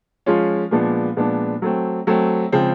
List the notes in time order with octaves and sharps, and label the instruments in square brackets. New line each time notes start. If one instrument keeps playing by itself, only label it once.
[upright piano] F3 G#3 C#4 F4
A#2 F3 G#3 B3 D4
A#2 F3 G#3 B3 D4
F#3 A3 C4
F#3 A3 C4
C#3 F3 G#3 C4